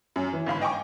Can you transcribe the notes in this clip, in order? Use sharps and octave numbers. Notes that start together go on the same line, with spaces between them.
F#2
E3
G1 G#2 F5 B5
D#5 G5 G#5 C#6 D6